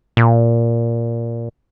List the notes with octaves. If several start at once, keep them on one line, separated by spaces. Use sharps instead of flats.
A#2